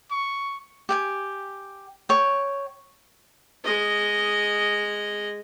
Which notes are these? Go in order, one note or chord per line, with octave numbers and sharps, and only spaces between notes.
C#6
G4 G5 G#5
C#5 G5
G#3 D#5